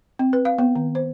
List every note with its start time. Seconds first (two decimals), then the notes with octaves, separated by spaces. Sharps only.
0.19 C4
0.33 B4
0.45 F5
0.58 B3
0.75 D#3
0.95 C5